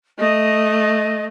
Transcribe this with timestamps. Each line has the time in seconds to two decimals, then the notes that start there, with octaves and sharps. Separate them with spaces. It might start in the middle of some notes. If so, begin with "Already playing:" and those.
0.19 A3 D#5